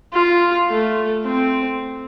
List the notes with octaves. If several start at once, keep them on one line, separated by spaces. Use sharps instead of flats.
F4
A3
C4